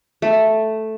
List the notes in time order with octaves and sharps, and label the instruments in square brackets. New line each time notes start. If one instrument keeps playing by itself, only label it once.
[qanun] A3